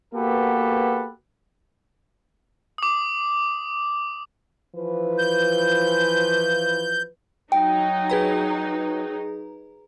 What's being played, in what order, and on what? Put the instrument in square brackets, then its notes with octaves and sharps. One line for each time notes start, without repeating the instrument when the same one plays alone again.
[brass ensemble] A#3 B3 F#4 G4 A4 B4
[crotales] D6 D#6
[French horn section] E3 F3 B4
[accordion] G6
[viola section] F#3 D#4 [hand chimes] G5
[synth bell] G#4 B4 A#5